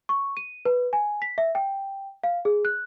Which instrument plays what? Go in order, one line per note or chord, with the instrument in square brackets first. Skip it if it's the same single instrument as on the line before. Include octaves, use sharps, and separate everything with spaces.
[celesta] C#6
D#7
B4
G#5
B6
E5
G5
F5
G#4
F#6